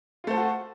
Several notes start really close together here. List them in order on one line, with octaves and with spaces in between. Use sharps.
F4 A3 C5 A4 F#4